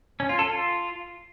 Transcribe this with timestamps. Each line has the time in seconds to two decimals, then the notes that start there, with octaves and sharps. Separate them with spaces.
0.20 C#4
0.29 F4
0.39 A4
0.48 F4